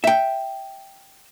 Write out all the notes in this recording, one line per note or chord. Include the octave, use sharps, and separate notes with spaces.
E5 G5